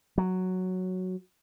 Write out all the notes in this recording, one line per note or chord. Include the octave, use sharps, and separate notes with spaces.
F#3